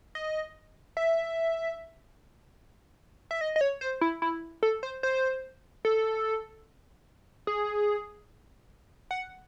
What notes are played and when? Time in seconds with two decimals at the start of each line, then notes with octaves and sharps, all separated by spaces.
0.15 D#5
0.97 E5
3.31 E5
3.41 D#5
3.56 D#5
3.61 C#5
3.81 C5
4.01 E4
4.22 E4
4.63 A4
4.83 C5
5.03 C5
5.85 A4
7.47 G#4
9.11 F#5